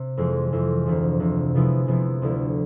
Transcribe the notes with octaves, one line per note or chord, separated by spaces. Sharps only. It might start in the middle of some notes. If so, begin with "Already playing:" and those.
Already playing: C3
F2 E3 G#3 C4
F2 E3 G#3 C4
D2 C3 F3
D2 C3 F3
C3 F3 G#3 B3 E4
C3 F3 G#3 B3 E4
D2 D3 F3 A3 E4